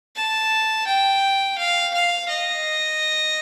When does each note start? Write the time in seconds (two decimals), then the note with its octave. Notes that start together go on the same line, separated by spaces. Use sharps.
0.16 A5
0.87 G5
1.58 F5
1.94 F5
2.28 D#5